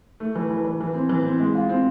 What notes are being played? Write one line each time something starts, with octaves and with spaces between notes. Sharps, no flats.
A3
E3
E3
E3
E3
C4
E3
C4
G#3
F4
C4